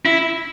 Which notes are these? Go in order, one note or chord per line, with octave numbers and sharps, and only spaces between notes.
E4